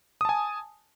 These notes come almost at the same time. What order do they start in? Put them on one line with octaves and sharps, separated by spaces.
D#6 A5 G#5